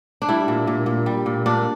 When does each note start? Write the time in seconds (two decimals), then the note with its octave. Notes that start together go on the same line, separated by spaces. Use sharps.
0.22 D4
0.29 G3 E4
0.48 A#2
0.67 A#2
0.86 A#2
1.06 G3
1.26 A#2
1.46 A#2 D4